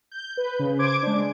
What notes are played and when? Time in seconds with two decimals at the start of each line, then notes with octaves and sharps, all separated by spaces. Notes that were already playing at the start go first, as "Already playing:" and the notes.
0.12 G6
0.37 B4
0.59 C#3
0.78 C5 D6 G#6 D7
1.02 G#3 D4